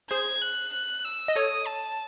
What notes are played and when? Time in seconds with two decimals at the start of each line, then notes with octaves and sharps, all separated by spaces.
0.11 G#4 C5 G#6
0.42 F#6
0.73 F#6
1.05 E6
1.28 D#5
1.35 A4 C#5 D#6
1.66 A5